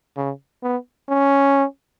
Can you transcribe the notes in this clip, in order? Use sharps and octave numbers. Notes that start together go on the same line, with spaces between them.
C#3
B3
C#4